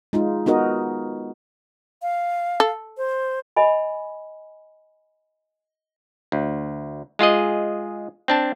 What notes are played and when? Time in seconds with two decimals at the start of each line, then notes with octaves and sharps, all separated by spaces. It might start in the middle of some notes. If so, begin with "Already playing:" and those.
0.13 G#3 D#4 F4
0.46 B3 D#4 F#4 A#4 D#5
2.02 F5
2.60 A4
2.97 C5
3.56 D#5 G#5 B5
6.32 D2
7.19 G#3 F4 G#4 D#5
8.28 C4 D4 A5